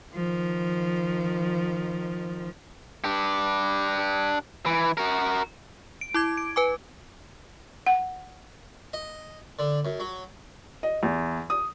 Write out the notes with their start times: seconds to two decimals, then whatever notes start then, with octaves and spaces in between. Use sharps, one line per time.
0.14 D#3 F3
3.04 D4 G4
4.66 E3
4.97 F#4 A#4
6.01 D7
6.14 E4 D6 G#6
6.37 D7
6.56 B4 G#5 D6
7.86 F#5
8.93 D#5
9.59 D3
9.85 F#2
10.00 F#3
10.83 D#5
11.03 E2
11.50 D#6